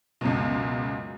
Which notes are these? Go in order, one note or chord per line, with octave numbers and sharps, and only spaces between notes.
C#2 F#2 B2